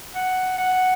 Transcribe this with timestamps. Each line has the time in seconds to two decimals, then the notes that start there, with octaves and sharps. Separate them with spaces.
0.15 F#5
0.58 F#5